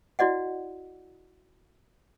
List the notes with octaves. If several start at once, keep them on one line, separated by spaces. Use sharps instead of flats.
E4 F#4 D5 D#5 F#5